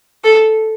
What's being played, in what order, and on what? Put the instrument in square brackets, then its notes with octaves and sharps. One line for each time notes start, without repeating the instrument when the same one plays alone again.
[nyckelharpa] A4